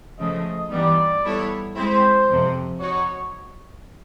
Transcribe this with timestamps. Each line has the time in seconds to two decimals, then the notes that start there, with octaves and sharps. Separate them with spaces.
0.19 C#3 F3 A3 D#5
0.71 G2 E3 G3 B3 D#4 D5
1.24 G3 B3 E4 A4 C#5
1.75 G#3 C4 E4 C5
2.28 F2 C3 F3
2.80 D#4 F#4 C#5